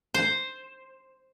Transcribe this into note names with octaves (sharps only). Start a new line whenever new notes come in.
C5